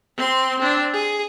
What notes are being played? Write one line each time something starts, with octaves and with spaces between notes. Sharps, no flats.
C4 C6
C4 D4
G#4